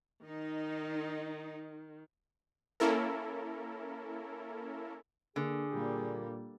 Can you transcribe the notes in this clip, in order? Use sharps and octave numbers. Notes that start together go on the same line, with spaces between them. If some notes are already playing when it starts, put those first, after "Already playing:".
D#3 D#4
A#3 C#4 E4 A4 A#4
D3 A#3 G#4
A#2 G3 A#3